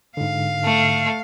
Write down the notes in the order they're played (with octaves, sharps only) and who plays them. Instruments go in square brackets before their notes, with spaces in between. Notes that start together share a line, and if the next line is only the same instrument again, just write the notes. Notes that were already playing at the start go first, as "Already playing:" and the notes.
[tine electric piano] G#2 D3 [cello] F5
[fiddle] A3